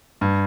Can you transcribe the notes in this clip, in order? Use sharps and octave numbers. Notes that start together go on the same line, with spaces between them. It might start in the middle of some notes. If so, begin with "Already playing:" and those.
G2